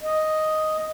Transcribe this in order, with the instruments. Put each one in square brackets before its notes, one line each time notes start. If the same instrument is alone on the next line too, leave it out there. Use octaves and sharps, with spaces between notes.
[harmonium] D#5